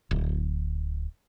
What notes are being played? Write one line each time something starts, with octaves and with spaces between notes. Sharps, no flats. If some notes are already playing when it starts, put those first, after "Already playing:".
D1